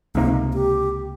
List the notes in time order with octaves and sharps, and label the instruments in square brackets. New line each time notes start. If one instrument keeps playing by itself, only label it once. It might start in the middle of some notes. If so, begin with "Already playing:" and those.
[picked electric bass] C#2 C3 F3 A#3 [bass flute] D#4
[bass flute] G4